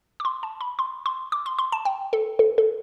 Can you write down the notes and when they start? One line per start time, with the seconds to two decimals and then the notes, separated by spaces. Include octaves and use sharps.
0.20 D6
0.25 C6
0.43 A5
0.61 B5
0.79 C6
1.06 C6
1.32 D6
1.46 C6
1.59 C6
1.72 A5
1.85 G5
2.13 A4
2.39 A4
2.58 A4